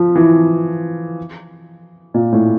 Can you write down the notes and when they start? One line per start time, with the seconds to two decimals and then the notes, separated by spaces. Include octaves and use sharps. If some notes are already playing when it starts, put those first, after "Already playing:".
Already playing: F3
0.15 E3
2.14 A#2
2.32 A2